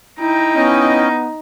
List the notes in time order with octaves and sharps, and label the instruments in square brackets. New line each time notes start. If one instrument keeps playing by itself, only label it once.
[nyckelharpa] D#4 A#5 [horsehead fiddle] E4 G5
[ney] B3 [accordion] C#4 D#5